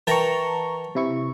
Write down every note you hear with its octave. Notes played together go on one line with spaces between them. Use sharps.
E3 A#4 G5 A5 A#5 C#6
C3 E4 C#6